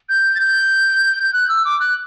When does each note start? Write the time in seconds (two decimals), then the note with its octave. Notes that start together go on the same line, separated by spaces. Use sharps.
0.09 G6
0.35 A6
0.40 G6
1.23 G6
1.33 F#6
1.49 E6
1.65 D6
1.80 F#6